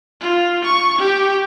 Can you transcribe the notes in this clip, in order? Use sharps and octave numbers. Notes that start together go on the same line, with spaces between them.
F4
C#6
G4